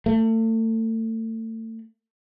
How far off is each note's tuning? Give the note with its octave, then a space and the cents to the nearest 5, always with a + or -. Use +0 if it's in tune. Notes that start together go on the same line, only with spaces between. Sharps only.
A3 +35